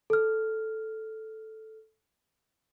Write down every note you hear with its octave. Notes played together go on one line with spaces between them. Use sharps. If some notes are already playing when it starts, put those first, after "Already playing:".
A4 F6